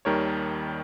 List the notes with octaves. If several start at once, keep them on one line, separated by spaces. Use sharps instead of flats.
D#2 D#3 G3 A#4 C#5